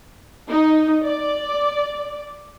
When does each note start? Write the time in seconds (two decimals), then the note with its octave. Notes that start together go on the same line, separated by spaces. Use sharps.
0.49 D#4
1.04 D5